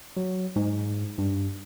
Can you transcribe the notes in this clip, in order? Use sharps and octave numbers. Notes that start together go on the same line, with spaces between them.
F#3
G#2
G2